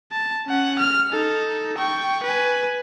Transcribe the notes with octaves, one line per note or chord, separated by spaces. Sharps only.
A5
C#4 F#5
F6
D#4 A4
G5 C#6
B4 G#5